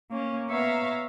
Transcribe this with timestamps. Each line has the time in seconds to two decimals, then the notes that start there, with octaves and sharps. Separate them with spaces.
0.11 A#3 C#4
0.49 B3 C#5 E5 F5 A#5